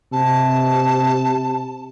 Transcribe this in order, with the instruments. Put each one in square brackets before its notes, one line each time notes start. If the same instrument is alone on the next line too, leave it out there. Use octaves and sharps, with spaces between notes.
[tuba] C3 [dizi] A5